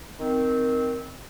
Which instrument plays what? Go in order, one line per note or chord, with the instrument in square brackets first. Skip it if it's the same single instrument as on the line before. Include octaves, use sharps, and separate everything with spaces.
[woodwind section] D#3 C4